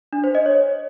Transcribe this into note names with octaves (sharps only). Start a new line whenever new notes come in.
D4
C5
D#5
C#5